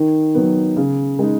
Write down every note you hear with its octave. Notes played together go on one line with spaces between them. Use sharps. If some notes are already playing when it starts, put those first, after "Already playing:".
Already playing: D#3
F#3 B3
C#3
G#3 D#4